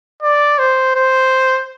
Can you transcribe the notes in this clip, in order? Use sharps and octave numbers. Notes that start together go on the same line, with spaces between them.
D5
C5
C5